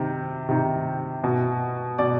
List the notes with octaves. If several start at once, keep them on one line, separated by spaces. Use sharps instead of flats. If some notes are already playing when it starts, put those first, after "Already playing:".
Already playing: C3 D#3
C3 D#3
B2
B2 D5